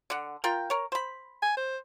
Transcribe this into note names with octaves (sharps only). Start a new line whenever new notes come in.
D3 F#5
F4 A#4 G5
A#4 C#5
C5 B5
G#5
C5